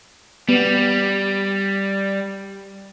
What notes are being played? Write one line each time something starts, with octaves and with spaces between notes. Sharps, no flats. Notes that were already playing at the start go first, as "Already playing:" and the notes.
G3 B3